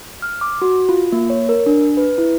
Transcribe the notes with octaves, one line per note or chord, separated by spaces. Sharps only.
F6
D6
F#4
F4
A#3
C#5
A#4
D4
B4
E4